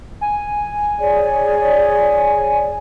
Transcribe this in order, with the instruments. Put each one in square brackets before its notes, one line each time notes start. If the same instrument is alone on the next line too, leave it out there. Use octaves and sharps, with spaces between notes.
[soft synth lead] G#5
[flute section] G#4 C#5 D5